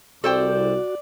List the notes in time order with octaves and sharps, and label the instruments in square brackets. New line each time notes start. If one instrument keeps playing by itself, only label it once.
[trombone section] C2 [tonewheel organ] F#4 [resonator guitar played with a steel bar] A4 C5 G5 [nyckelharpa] D5